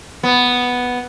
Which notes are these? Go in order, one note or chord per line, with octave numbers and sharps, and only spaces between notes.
B3